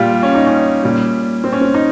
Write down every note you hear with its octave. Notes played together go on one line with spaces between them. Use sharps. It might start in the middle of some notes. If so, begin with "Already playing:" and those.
Already playing: A#2 G3 F4 G4
C#4
D#4
C#4
A#2 G3
C4
C#4
C4
D#4